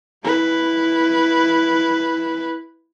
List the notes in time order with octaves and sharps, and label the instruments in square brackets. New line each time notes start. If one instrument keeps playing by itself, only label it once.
[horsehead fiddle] E4 B4